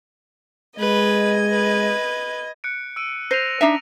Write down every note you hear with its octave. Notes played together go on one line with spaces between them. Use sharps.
G#3 B4 D#5 G#6
B4
F#6 C#7 D7
E6 D7 D#7
C5 A#6 D#7 F7
D4 D#4 E5